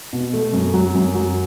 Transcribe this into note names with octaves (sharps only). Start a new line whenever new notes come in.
B2
A3
F#2
F#3
F#2
F#3